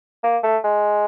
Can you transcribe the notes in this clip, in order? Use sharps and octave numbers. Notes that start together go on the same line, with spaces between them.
A#3
A3
G#3